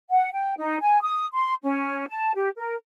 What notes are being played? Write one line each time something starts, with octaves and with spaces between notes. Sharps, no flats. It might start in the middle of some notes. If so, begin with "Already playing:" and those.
F#5
G5
D#4
G#5
D#6
C6
C#4
A5
G4
A#4